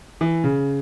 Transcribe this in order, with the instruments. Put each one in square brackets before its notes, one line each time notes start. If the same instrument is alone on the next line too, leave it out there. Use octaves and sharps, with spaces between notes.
[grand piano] E3
C#3